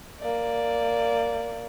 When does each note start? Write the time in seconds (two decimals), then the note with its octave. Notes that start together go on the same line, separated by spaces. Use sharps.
0.20 A#3 D5